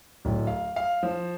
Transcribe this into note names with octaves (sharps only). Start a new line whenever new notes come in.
D1
F5
F5
F3